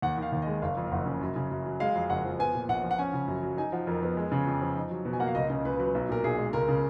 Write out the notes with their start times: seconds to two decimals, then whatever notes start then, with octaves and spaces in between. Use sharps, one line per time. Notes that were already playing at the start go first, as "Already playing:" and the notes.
0.02 D#2 F#5
0.18 D#3 F5
0.32 D#2
0.42 G#3 D#5
0.62 F#1 F5
0.77 F2
0.87 F5
0.92 F#1 F#5
1.06 C#3
1.21 F#2
1.36 C#3
1.51 F#2
1.66 F#3
1.80 G#3 F5
1.95 F2
2.10 F#1 F#5
2.25 F3
2.39 B3 G#5
2.54 A#2
2.69 A#1 F#5
2.83 F3
2.91 F#5
2.98 C#4 G#5
3.13 C#3
3.28 F#2
3.43 F#3
3.58 D#4 G#5
3.72 F3 F#5
3.87 F2 A#4
4.02 B3 A#4
4.17 G#3
4.32 C#3
4.46 F2
4.62 F3
4.76 D#4
4.91 F#3
5.05 B2
5.13 G#5
5.20 A#3 F#5
5.27 F5
5.35 C#2 D#5
5.50 C#3 D#5
5.65 C#2 B4
5.79 F#3 B4
5.94 B1
6.09 A#2 A#4
6.24 B1 G#4
6.39 G#3
6.53 C#2 A#4
6.68 C#3